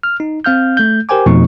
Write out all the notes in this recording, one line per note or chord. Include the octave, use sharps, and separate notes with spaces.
F6
D#4
C4 F5 F6 G6
A3 G6
G4 A#4 C5 G5 G#5 D6
F2 B2 F3 A3 D#4 C#6